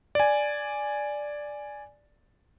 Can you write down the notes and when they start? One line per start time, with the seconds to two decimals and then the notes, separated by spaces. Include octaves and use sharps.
0.15 D5 G#5